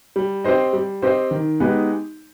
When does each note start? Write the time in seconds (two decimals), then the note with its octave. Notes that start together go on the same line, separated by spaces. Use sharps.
0.16 G3
0.44 C4 G4 C5 D#5
0.73 G3
1.02 C4 G4 C5 D#5
1.31 D#3
1.60 G#3 B3 D#4 G4